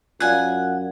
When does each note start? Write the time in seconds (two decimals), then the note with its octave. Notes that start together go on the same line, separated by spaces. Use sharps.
0.20 F#2 F4 D5 F5 F#5 G#5